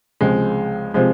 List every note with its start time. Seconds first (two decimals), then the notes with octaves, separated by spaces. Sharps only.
0.21 C#2 C3 F3 G#3
0.94 C3 F3 G#3